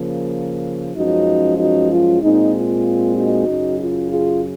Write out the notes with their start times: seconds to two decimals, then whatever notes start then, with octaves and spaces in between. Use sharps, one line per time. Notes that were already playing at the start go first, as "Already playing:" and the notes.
Already playing: C#3 F3 A#3
0.95 F#2 F3 G#3 C#4 D#4 F#4
1.58 D#4 F#4
1.91 F4
2.22 A#2 G#3 C4 D#4
2.53 F4
3.15 D#4 F#4
3.47 F#2 C#3 F#3
3.78 F4
4.09 F4 G#4